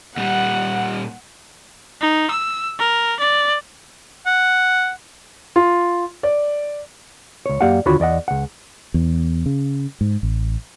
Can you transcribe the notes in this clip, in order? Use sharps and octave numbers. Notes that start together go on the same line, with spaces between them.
A#2 G3 F#5
D#4
E6
A#4
D5
F#5
F4
D5
C#2 C#5
F#2 A#3 G4 D5 F5 F#5
D#2 D3 F4 F#4 C#5 B5
E2 D5 D#5 F#5
C#2 F#5
E2
C#3
G#2
A1